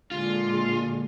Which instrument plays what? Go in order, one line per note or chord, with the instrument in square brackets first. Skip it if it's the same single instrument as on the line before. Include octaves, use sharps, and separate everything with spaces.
[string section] A#2 D3 G#3 [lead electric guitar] F4